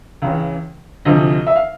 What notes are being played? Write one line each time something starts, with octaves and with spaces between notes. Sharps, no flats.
C#2 C#3 E3
D2 C3 F3 D#4 D#5
E5
F5